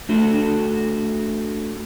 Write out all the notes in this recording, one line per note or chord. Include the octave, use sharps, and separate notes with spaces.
A3 D4 F#4 A4